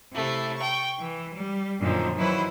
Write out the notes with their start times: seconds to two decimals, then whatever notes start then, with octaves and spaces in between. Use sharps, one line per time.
0.13 C3 A3 E4
0.58 G5 C#6
1.00 E3
1.36 G3
1.80 F#2 A#2 D3 D#3 F3
2.17 D#3 E3 F#3 E4 B4 C5